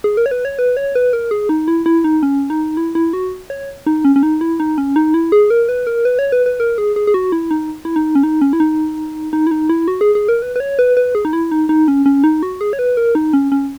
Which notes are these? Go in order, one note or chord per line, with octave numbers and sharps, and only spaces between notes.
G#4
A#4
C#5
B4
C#5
B4
C#5
B4
A#4
G#4
D#4
E4
E4
D#4
C#4
D#4
E4
E4
F#4
C#5
D#4
C#4
C#4
D#4
E4
D#4
C#4
D#4
E4
G#4
A#4
B4
A#4
B4
C#5
B4
B4
A#4
G#4
G#4
G#4
F#4
E4
D#4
E4
D#4
C#4
D#4
C#4
E4
D#4
D#4
E4
D#4
E4
F#4
G#4
G#4
A#4
B4
B4
C#5
B4
B4
G#4
D#4
E4
D#4
D#4
C#4
C#4
D#4
F#4
G#4
C#5
B4
A#4
D#4
C#4
C#4